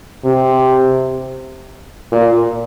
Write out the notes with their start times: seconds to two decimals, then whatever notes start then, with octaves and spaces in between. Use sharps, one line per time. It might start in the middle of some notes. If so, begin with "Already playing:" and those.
0.25 C3
2.12 A#2